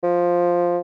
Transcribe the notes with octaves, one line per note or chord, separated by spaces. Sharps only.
F3